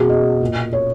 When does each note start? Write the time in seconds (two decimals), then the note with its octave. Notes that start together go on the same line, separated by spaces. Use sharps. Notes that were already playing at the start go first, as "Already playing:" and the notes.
Already playing: B2 F#4 G#4
0.09 D#5
0.41 A#2
0.73 C#5